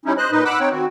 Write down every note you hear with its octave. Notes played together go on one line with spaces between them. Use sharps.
G3 C#4 D#4 E4
C5 D#5 F#6
A#2 D#4 B4 D#5
F#5 B5 D6 E6 F#6
C4 D#4 C#5 G5
D#3 C4 F#4